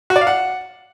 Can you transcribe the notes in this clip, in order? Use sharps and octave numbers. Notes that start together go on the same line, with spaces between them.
F#4
D5
F5
F#5